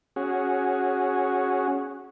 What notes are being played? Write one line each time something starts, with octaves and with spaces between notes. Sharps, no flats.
C#4 F#4 G#4